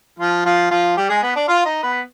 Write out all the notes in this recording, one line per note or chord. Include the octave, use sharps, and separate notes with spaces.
F3 F4
F3 F4
F3 F4
G3 G4
G#3 G#4
B3 B4
D4 D5
F4 F5
D#4 D#5
B3 B4